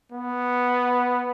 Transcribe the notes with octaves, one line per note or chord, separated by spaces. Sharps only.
B3